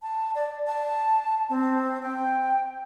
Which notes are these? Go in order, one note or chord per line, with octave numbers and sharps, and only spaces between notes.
A5
D5
A5
C4
G5